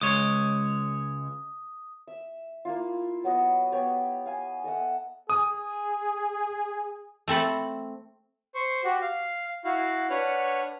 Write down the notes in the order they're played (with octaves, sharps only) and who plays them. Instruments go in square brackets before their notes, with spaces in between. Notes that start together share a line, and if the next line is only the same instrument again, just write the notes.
[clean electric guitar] C#2 G#3 C#5 [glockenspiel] D#6
[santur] E5
A#3 E4 F4
F#3 B3 F#4 D#5
B3 G4 C#5 B5
F5 G#5
A4 D#5 E5 F#5
[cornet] G#4 [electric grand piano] D#6
[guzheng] A3 C4 A4 B5
[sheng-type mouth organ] C5 C#6
F#4 G4
F5
E4 F#4 F5
D4 B4 C#5 F#5 F6